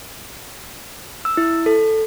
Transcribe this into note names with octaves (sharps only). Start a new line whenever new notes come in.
E6
E4
A4